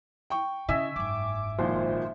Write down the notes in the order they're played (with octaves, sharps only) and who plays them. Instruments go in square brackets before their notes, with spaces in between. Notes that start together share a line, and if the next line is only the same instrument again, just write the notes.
[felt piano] G5 C#6
[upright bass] C#3 E4 [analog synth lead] D#5 [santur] E5 G#5 E6
[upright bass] F#1 G#2 [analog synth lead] D6
[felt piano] G#1 A#2 F3 [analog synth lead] C5